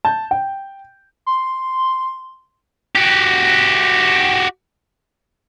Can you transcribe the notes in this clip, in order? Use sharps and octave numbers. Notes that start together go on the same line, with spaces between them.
A5 G6
G5
C6
F#4 G4